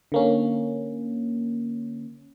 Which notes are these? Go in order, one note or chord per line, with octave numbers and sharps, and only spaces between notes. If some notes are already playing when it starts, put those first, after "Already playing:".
D3 A#3 C#4